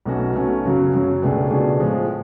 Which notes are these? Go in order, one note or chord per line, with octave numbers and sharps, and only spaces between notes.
B1 B2 A3 C#4 F#4
B1 B2 A3 C#4 F#4
F#2 C#3 F#3
F#2 C#3 F#3
C#2 B2 A3 D4 G#4
C#2 B2 A3 D4 G#4
A2 F3 G#3